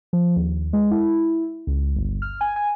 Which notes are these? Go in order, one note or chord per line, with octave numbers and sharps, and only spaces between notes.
F3
D#2
G#3
E4
C#2
G1
F6
G#5
G#5